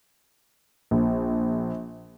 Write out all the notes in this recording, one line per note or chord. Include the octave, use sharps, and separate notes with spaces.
A#1